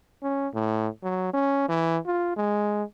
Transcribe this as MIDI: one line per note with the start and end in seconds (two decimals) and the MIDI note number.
0.23 0.48 61
0.54 0.88 45
1.04 1.32 54
1.34 1.69 61
1.69 1.98 52
2.06 2.32 65
2.37 2.83 56